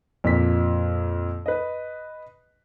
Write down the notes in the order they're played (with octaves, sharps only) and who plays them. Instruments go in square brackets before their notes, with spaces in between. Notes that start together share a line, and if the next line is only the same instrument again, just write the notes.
[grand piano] F2 A#2 B6
B4 D#5